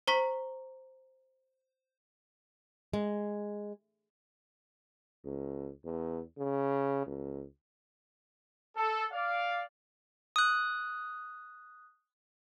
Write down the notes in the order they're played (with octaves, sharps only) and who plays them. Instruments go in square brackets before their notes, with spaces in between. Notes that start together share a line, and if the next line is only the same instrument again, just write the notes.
[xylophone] C5 A#5 C#6 B6
[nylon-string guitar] G#3
[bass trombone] C#2
E2
C#3
C#2
[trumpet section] A4
D5 F5
[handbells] D#6 F#6